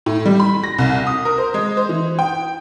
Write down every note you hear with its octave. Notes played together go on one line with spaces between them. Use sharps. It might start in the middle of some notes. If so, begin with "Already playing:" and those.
A2
G3
B5
A#6
C2
D#6
A#4
C5
G#3
C5
E3
G5